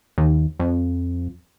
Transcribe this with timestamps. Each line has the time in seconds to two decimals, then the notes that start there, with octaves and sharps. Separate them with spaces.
0.18 D#2
0.60 F2